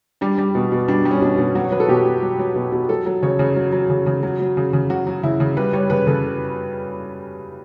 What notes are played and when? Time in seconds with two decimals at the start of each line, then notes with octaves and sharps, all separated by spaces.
0.21 G3 D4
0.38 G3
0.55 B2
0.72 B2
0.88 G3 D4
1.05 G3
1.11 C#4
1.22 B2 D4
1.38 B2
1.55 F#3 F#4
1.64 C#5
1.72 F#3 B4
1.80 A4
1.88 B2 G4
2.06 B2
2.23 F#3
2.39 F#3
2.56 B2
2.72 B2
2.89 F#3 A4
3.06 F#3
3.23 C#3 C#5
3.39 C#3
3.56 F#3
3.72 F#3
3.90 C#3
4.06 C#3
4.23 F#3
4.40 F#3
4.57 C#3
4.73 C#3
4.90 F#3 F#4
5.07 F#3
5.23 C#3 E4
5.40 C#3
5.57 G3 B4
5.73 G3 C#5
5.90 C#3 B4
6.07 C#3 A4